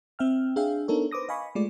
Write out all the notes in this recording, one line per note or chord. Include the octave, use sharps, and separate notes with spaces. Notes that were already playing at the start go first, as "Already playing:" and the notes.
C4 E5 G5 F6
D4 G#4 E5 F5 G5
B3 D4 D#4 A4 A#4 C#5
B4 C5 D6 D#6 A#6
D#5 F5 G#5 B5 C#6
G#3 A3 F4 D5